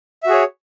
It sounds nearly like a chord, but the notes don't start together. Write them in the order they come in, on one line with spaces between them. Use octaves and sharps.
E5 F#4 G#4 C#5